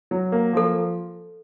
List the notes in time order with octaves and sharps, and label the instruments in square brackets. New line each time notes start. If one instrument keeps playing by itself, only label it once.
[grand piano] F#3
A#3
[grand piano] F3 [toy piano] A4